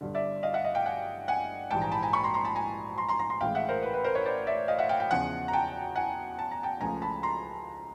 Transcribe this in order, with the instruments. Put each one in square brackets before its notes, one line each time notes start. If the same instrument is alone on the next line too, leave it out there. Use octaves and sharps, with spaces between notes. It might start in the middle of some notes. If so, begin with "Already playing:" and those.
[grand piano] G1 G2 D3
D5 E5
D#5 F5
E5 F#5
D#5 F5
F5 G5
F#5 G#5
F#5 G#5
A#1 G#2 E3 G3 G5 A5
G#5 A#5
A5 B5
G#5 A#5
B5 C#6
A#5 C6
A#5 C6
A5 B5
G#5 A#5
A#5 C6
A#5 C6
A#5 C6
A#5 C6
A1 A2 E3 G#3 F5 G5
E5 F#5
A#4 C5
B4
B4
A#4 C5
B4 C#5
C5 D5
D5 E5
D#5 F5
E5 F#5
F5 G5
F5 G5
E2 C#3 F3 F#5 G#5
A#5
G5 A5
F#5 G#5
A5
A#5
G5 A5
C#2 C#3 F3 A3 G#5 A#5
A5 B5
A#5 C6